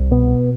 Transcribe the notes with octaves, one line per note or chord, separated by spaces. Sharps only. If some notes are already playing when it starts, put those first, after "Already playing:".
Already playing: C2
B2 B3